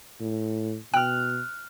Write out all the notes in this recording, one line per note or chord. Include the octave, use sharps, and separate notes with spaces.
A2
B2 G5 F6 F#6